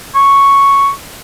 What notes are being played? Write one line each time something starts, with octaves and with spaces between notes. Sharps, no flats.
C#6